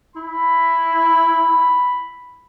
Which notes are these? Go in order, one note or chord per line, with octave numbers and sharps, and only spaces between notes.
E4 B5